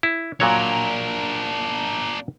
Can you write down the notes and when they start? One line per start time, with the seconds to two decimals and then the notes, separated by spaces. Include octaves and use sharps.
0.03 E4
0.40 A#2 F#3 D4 A#4 C#5